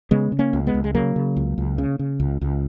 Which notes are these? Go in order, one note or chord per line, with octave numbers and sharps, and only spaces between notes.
C#3 G#3 B3
C#3
A#3 C#4
C#2
G#3 B3
C#2
G#3
C#3 F#3 A#3
C#3
C#2
C#2
C#3
C#3
C#2
C#2